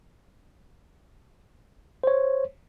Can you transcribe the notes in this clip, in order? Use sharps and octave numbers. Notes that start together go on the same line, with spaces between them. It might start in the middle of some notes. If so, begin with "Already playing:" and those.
C5 C#5